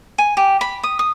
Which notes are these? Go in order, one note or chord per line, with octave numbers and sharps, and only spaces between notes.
G#5
G4
B5
D#6
D#6